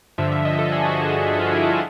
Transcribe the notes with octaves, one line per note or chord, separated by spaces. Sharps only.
G2 D3 F3 E5
E5
D#5
A4
G#4
F#4
F4
E4
F4